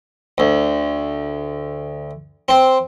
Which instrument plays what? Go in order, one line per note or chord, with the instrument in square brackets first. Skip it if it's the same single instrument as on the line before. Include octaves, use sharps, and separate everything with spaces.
[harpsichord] D2
C4